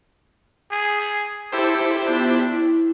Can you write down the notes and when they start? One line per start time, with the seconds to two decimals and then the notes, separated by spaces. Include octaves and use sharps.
0.71 G#4
1.52 E4 G4 A4 C5
2.06 B3 D4 F4
2.48 E4